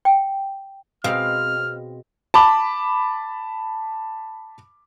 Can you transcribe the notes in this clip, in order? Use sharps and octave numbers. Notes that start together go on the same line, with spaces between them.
G5
B2 G#3 C4 F5 F6
A5 B5 D6